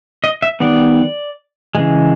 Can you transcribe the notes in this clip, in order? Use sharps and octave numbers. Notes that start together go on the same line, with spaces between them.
D#5
E5
D#3 G3 B3 D5
C#3 E3 G#3